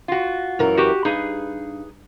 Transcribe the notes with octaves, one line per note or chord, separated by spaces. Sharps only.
F4 F#4
F#2 E3 A#4
F#4 G4
G2 D#4 G#4 B4